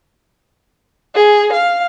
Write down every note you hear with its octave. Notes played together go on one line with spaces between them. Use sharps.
G#4
F5